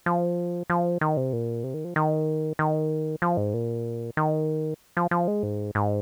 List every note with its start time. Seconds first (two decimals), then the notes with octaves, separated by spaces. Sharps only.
0.06 F3
0.70 F3
1.01 D#3
1.17 C3
1.33 A#2
1.64 C3
1.74 D#3
1.85 F3
1.96 D#3
2.59 D#3
3.22 F3
3.37 G#2
3.54 A#2
4.17 D#3
4.97 F3
5.11 F3
5.28 G#3
5.43 G#2
5.75 G#2